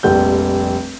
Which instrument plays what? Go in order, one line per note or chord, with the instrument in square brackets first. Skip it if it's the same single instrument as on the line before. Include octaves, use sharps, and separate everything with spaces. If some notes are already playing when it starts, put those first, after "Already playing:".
[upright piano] F1 A#1 G3 G6